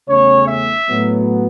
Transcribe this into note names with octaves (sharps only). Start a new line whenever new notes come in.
E2 C#3 A3 C#4 C#5
E5
A2 F#3 B3